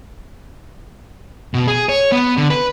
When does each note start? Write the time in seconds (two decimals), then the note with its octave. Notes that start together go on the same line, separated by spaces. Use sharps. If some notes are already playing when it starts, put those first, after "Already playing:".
1.54 B2
1.68 G#4
1.89 C#5
2.12 B3
2.37 D3
2.50 B4